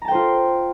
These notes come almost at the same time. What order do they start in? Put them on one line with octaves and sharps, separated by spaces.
A#5 A5 G5 C5 F4